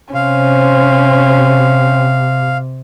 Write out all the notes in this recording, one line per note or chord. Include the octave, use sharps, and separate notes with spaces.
C3 C#4 C5 F5